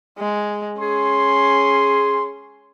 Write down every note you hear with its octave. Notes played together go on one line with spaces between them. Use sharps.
G#3
C#4 G#4 C6